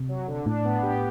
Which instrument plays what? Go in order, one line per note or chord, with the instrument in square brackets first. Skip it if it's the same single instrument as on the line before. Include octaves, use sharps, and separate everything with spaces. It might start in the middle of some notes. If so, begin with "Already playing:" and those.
Already playing: [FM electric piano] C3
[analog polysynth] F#3
D3
[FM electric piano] A2 [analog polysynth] D4
[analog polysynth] B3
G4